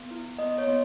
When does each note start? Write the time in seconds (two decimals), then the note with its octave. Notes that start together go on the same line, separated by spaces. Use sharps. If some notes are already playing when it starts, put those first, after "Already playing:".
Already playing: B3
0.11 E4
0.39 B3 D#5
0.58 C#5
0.67 B3